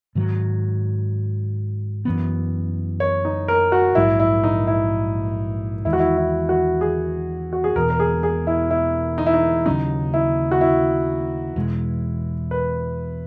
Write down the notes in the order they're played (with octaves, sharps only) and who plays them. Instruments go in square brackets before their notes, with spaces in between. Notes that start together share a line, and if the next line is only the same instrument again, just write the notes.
[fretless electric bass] G#2 D#3 F#3
F#2 E3 B3
[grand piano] C#5
D#4
A#4
F#4
[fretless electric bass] A#1 G#2 F#3 [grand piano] E4
[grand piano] E4
D#4
E4
[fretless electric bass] E2 D#3 G#3 [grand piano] E4
[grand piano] F#4
E4
E4
F#4
G#4
F#4
G#4
[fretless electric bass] E1 E2 B2 [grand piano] A#4
[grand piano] A#4
G#4
G#4
E4
E4
D#4
E4
D#4
[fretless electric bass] D#2 C#3 F#3 C#4 [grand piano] D#4
[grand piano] E4
F#4
E4
[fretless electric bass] E2 B2 G#3
[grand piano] B4